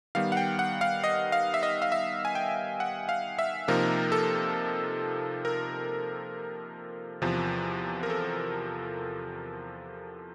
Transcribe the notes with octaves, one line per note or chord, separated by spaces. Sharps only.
D#3 G3 B3 F5
F#5
G5
F#5
F5
D#5
F5
E5
D#5
F5
E5
G#5
G5
F#5
F5
E5
C3 F3 A#3 D#4 A#4
A4
A#4
E2 C3 F3
A#4
A4